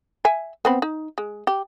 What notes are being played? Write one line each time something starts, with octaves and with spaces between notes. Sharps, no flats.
E5 G#5
B3 C4 B5
D#4
G#3
G4